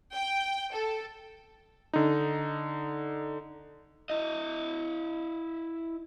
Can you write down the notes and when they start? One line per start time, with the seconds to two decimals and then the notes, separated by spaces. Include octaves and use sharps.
0.13 G5
0.74 A4
1.93 D3 D#4
4.10 E4 D#5